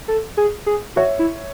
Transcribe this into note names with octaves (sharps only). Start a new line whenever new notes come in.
A4
G#4
G#4
F#4 C#5 E5
E4